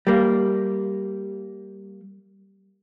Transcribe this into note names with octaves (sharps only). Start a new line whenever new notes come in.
G3 A#3